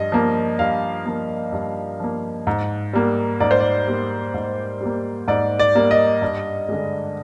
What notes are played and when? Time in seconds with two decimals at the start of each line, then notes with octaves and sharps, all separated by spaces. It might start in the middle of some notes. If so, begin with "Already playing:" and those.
Already playing: G2 F3 D#5
0.12 F3 A#3
0.59 G2 F5
1.06 F3 A#3
1.53 G2
2.00 F3 A#3
2.47 G#2
2.93 G3 A#3
3.40 G#2 D5
3.51 C5
3.60 D5
3.87 G3 A#3
4.34 G#2
4.81 G3 A#3
5.28 G#2 D5
5.59 D5
5.75 G3 A#3
5.91 D#5
6.22 G2
6.69 D3 G#3